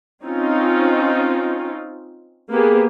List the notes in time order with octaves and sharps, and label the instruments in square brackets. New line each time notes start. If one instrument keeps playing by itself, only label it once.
[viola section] C4 C#4 D#4 F4
A#3 B3 G4 G#4